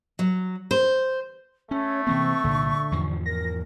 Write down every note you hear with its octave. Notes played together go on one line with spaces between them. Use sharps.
F#3
C5
A3 C#4 C#5
C3 E3 A#3 C4 C#6
C2 A#2 D3
E2 G#2 F3
A#4 A#6